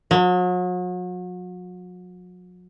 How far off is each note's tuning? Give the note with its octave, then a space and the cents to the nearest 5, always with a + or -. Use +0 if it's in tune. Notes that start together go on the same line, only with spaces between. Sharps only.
F#3 -40